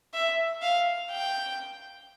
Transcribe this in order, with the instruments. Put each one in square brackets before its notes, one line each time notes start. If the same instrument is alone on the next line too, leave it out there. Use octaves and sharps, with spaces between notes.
[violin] E5
F5
G5